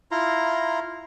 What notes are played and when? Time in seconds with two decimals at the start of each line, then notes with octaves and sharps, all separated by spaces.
0.11 E4 F4 A#5 C6